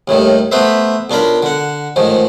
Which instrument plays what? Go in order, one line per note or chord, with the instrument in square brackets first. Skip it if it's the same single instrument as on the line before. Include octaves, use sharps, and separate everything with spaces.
[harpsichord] D#2 A2 D#3 G3
A3 B3 B4 C5 E5
B1 D4 F4 A#4 B5
D3 F#5
A1 G#2 D#3 F3